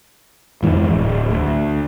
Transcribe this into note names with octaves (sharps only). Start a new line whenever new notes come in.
F2 G#2 E3
D1
D2